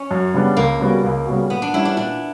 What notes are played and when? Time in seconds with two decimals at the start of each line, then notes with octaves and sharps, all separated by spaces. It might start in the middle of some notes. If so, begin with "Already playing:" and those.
Already playing: C#4
0.11 F#2
0.34 C#3 G3 B3 D4
0.57 C#2 A#3
0.80 C#3 G3 B3 F#4
1.04 C#2
1.26 C#3 G3 B3 F#4
1.50 A#2 B3
1.62 D4
1.74 G3 C#4 E4
1.85 D4
1.96 A#2 D4